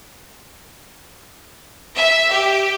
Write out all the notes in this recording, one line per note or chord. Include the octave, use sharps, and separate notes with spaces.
E5
G4